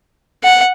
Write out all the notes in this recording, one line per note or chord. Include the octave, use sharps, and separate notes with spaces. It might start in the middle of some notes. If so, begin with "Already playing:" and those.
F#5